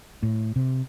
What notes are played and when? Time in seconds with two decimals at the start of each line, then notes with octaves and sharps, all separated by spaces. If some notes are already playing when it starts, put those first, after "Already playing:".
0.23 A2
0.56 C3